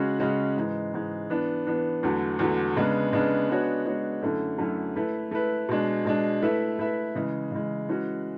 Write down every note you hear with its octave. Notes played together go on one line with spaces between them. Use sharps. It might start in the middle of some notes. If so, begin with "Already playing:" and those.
Already playing: C#3 G#3 C#4 F#4
C#3 G#3 C#4 F#4
G#2 E3 G#3
G#2 E3 G#3
E3 B3 D4
E3 B3 D4
E2 D3 F#3 A3
E2 D3 F#3 A3
C#3 G#3 B3 D4
C#3 G#3 B3 D4
G#3 B3 D4 F#4 C#5
G#3 B3 D4 F#4 C#5
F#2 D3 A3 C#4 E4
F#2 D3 A3 C#4 E4
A3 E4 B4
A3 E4 B4
B2 G#3 D4
B2 G#3 D4
A3 E4 B4 E5
A3 E4 B4 E5
C#3 E3 G#3
C#3 E3 G#3
E3 G#3 C#4 F#4